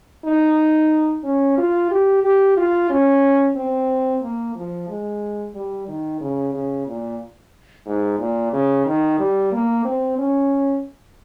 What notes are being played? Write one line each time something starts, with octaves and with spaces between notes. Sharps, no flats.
D#4
C#4
F4
G4
G4
F4
C#4
C4
A#3
F3
G#3
G3
D#3
C#3
C#3
A#2
G#2
A#2
C#3
D#3
G3
A#3
C4
C#4